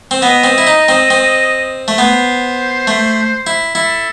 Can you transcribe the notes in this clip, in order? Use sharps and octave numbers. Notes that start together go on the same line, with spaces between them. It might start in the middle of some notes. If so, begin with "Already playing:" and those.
C4
B3 D#5
C4
E4
D#4
C4
C4
A3
B3 C5
A3
E4
E4 A4